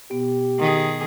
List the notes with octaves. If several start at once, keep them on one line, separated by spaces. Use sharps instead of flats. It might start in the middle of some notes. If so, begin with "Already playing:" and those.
B2 B3 G4
D#3 G#4